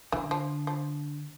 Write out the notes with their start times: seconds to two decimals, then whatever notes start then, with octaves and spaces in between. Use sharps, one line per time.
0.12 D3 E3
0.31 F3
0.67 F3